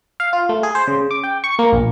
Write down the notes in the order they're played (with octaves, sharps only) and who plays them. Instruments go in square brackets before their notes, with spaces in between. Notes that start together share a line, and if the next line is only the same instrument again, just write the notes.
[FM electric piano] F5
F4
A3
G#4
C5
C#3
D6
G5
C#6
A#3
A#1